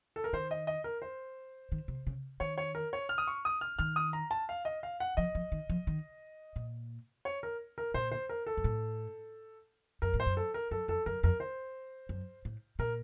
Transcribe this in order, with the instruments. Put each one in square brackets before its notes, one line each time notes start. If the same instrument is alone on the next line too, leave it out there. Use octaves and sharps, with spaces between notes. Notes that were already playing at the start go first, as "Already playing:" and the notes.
[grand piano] A4
A#4
[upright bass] D#3 [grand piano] C5
[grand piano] D#5
D#5
A#4
C5
[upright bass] D#3
C3
C#3
[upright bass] D#3 [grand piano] C#5
[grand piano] C#5
A#4
C#5
F6
D#6
C#6
D#6
F6
[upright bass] D#3 [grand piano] F6
[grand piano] D#6
A#5
A5
F5
D#5
F5
F#5
[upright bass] F3 [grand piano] D#5
[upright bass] F3
D#3
F3
D#3
A#2
[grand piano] C#5
A#4
A#4
[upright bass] A#2 [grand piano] C5
[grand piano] C5
A#4
A4
[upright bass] F#2
A2
[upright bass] F#2 [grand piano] A#4
[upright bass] A2
[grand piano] C5
[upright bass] F#2
[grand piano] A4
A#4
[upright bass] F#2 [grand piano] A4
[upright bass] F2 [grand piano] A4
[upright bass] F#2 [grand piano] A#4
[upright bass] F2 [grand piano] A#4
[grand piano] C5
[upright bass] F#2
A2
[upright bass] A#2 [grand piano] A#4